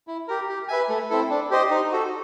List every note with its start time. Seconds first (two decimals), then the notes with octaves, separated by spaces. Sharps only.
0.08 E4
0.28 G4 A#4
0.49 G4
0.68 B4 E5 G#5
0.89 A3
1.10 C4 E4 A4
1.30 D4
1.51 G4 C5 D#5
1.71 D#4
1.92 F#4 A4